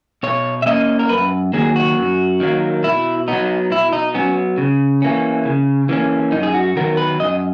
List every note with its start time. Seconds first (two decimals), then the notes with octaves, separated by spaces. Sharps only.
0.23 B2 C#5
0.62 E5
0.66 A#3 C#4 D#5
0.99 A#4
1.09 F#2 B4
1.53 D#3 F#3 A#3 G#4
1.76 F#4
1.97 F#2
2.40 D#3 F#3 A#3
2.84 B2 E4
3.28 F#3 B3 D#4
3.71 B2 E4
3.93 D#4
4.14 F#3 B3 C#4
4.58 C#3
5.02 E3 A#3 C#4
5.45 C#3
5.89 E3 A#3 C#4
6.32 F#2 D#4
6.43 G#4
6.54 F#4
6.76 D#3 F#3 B3 A#4
6.97 B4
7.20 F#2 D#5